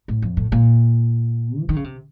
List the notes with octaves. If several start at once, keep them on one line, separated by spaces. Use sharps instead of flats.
A2
F2
A2
A#2
F3
D#3
C#3
C3